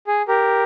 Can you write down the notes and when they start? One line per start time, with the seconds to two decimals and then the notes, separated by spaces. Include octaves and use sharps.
0.07 G#4
0.28 G4 A#4